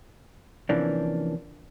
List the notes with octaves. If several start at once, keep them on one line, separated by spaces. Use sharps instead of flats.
C3 E3 F3 A#3 C#4 D4